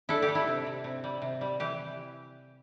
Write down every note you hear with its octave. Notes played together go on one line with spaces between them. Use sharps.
D4 E4 A4
G4
G3
E4
C3
C3
C3
G3
C3
G3
E3 G4